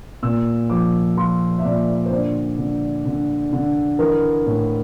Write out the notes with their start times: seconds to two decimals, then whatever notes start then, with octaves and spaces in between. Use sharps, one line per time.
0.23 A#2 E6
0.70 F3 D6
1.17 F3 C6
1.58 E5
1.65 A#2 D5
2.06 C5
2.11 D3 D5
2.58 D3
3.06 D3
3.53 D3
3.99 E3 A#4
4.47 A2